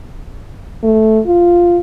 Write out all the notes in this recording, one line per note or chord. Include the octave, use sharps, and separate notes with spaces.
A3
F4